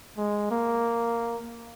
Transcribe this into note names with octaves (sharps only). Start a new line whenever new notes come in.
G#3
A#3